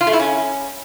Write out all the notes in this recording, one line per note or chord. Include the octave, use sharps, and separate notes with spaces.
F4
A3
E4
C#4